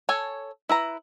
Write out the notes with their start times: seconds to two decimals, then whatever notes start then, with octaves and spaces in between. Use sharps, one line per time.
0.09 A4 C#5 G#5
0.69 E4 B4 A#5